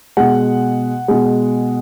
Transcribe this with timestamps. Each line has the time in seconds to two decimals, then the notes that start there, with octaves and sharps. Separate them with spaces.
0.17 B2 G#3 F#5
1.08 B2 G#3